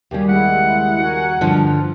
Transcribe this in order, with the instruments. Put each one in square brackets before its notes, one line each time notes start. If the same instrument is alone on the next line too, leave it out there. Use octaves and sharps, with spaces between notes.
[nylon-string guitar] D#2 C#3 G3 [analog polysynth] G4 G#5
[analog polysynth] G#3 E4 [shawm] F#5
[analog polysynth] F#4 A#4 G#5
[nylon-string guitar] G2 [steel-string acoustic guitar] D3 F3 [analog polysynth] F6